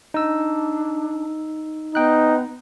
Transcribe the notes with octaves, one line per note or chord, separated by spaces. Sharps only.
D4 D#4 E6
B3 D#4 G5 F#6